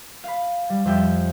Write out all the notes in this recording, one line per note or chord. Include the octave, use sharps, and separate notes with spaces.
F5 B5
G3
F2 F3 G3 E5 G5 F6